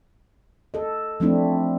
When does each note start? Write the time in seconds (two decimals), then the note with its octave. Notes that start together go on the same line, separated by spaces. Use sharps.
0.74 A4 D#5
1.20 F3 A3 C4 D4 E4